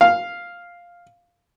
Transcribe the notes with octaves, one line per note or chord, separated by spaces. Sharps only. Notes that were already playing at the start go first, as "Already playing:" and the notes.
F5